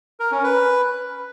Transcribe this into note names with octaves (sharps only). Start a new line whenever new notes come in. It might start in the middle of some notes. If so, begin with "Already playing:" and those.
A#4
C#4
B4